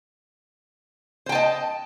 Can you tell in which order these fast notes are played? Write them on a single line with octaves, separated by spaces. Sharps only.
C5 G5 A5 D#5